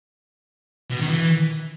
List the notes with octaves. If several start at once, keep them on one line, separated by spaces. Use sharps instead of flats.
B2
D#3
E3